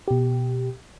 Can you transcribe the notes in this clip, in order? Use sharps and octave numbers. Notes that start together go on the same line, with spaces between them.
B2 G4